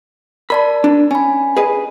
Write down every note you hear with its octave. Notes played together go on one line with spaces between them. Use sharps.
A#4 D5 A5 B5
D4
C#4 G#5 B5
G#4 B4 D#5